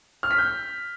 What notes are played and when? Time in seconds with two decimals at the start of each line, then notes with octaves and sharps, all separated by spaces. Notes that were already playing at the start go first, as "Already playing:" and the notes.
0.23 F6
0.31 B6
0.38 G6